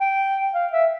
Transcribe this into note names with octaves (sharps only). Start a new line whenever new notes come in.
G5
F5
E5